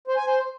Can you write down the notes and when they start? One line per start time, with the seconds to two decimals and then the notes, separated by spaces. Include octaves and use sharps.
0.08 C5
0.17 G#5
0.26 C5